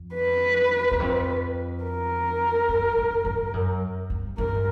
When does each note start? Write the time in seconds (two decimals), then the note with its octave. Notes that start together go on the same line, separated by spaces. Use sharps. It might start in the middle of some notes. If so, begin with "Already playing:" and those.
Already playing: F2
0.15 B4
0.91 E2
1.00 F2
1.84 A#4
2.68 F#2
2.97 F#2
3.25 G2
3.53 F#2
4.10 G2
4.38 G2 A#4